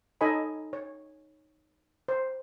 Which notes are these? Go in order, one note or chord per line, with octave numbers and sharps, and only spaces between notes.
D#4 A4 C#5 D#5 G#5 B5
C#5
C5